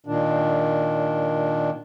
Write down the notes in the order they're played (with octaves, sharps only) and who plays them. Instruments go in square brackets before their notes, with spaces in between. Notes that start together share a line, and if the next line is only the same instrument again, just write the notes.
[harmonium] A#2 D#3 D4